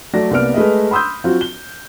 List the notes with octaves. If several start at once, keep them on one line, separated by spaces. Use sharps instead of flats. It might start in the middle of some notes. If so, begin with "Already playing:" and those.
F#3 A3 D5 A#6
C2 A#3 B3 D5 F6 D7
G#3 A3 G#4 B4 D#5
B5 C6 D#6 E6 G6
F#3 C4 F4 F#4
G7